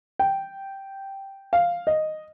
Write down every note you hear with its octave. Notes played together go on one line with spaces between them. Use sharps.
G5
F5
D#5